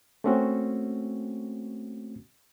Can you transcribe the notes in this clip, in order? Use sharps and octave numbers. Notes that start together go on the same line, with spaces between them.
A3 A#3 C4 C#4 F#4